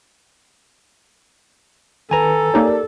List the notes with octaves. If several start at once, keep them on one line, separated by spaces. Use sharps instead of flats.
D#3 A4 B4 G#5 A#5
A#3 D#4 G4 A#4 C#5 D5